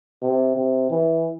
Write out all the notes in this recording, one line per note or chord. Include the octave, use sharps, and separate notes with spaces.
C3
C3
E3